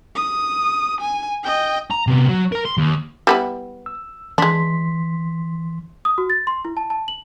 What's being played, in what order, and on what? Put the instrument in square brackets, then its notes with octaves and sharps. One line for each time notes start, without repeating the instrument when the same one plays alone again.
[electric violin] D#6
G#5
D#5 G5
[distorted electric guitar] A#5
C3 B3
F#3
A#4 A#5
C6
D#2
[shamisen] G3 B3 E4
[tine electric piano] E6
[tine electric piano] E3 C6 B6 [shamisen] G#3 D4
[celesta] D#6
F#4
A6
C6
E4
A5
A5
F#7